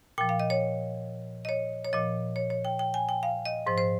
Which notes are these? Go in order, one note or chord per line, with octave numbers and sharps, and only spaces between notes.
A#2 F3 G5
F5
D#5
C#5
D#5
C#5
C#5
A#2 F3 D#5
C#5
C#5
G5
G5
G#5
G5
F5
D#5
G#2 F3 C5
C5